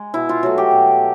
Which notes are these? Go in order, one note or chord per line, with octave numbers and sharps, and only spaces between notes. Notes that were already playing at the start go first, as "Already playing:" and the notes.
Already playing: G#3
B2 E4
F4
F#3 A3 F#4
G4
B2